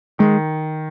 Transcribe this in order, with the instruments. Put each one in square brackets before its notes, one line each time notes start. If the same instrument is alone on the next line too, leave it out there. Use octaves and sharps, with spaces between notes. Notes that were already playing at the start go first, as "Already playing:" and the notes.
[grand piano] D#3 [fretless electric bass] G#3